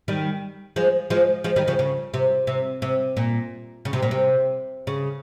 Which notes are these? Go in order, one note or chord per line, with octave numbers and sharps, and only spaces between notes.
D#3 G3
F3 G#3
F3 G#3
F3 G#3
D#3 G3
C#3 F3
C#3
C3
C3
C3
A#2
C#3
C3
A#2
C3
C#3